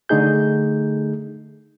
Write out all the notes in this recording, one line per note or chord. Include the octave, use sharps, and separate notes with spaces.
D3 A3 D#4 G#4 G6